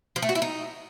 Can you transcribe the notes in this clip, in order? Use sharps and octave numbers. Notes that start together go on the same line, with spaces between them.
F3
A3
F#4
E4
D#4